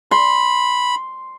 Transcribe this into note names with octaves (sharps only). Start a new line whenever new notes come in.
B5 C6